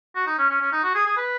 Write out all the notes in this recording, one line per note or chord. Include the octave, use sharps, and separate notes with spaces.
F#4
D#4
C#4
C#4
C#4
D#4
F#4
G#4
G#4
B4